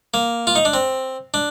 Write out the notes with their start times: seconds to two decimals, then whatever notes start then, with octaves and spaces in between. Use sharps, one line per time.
0.14 A#3
0.47 F4
0.55 D#4
0.65 D4
0.73 C4
1.34 D4